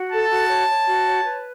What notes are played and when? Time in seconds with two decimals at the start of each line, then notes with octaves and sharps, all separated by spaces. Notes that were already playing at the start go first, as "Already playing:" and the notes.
Already playing: F#4
0.12 A4 A5
0.30 F#4
0.49 C#5
0.69 C#5
0.87 F#4
1.06 C#5
1.25 B4